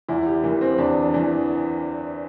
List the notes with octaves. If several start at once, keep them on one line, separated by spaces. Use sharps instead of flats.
E2 E4
G4
E3 A#3
C4
E2 D4
E3